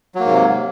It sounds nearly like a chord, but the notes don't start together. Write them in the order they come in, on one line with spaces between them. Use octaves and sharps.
F#3 A#3 G#2 C3